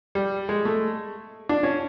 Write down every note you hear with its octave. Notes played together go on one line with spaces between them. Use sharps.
G3
G#3
A3
D4
C#4